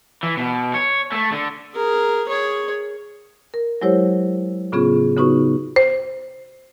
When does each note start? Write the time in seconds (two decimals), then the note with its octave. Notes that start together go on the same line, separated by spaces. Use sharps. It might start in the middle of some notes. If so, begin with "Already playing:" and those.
0.23 E3
0.37 B2
0.74 C#5
1.12 A3
1.32 D3
1.74 G#4 A#4
2.27 G#4 C#5
3.54 A#4
3.82 F#3 G#3 E4 G4 C5 C#5
4.72 A2 C#3 B3 C#4 F4 G#4
5.17 C#3 B3 D#4 F#4 B4 C#6
5.76 C5